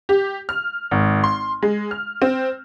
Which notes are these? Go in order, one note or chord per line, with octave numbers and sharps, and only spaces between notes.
G4
F6
G#1
C6
G#3
F6
C4